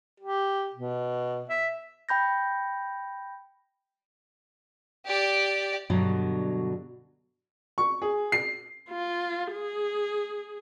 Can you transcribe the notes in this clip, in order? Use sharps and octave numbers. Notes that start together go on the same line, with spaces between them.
G4
B2
E5
G5 B5 G6 A#6
G4 D5
G2 B2 D3 F#3
C#6
G#4
C7
F4
G#4